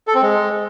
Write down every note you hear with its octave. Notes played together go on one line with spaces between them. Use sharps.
A4
C4
G#3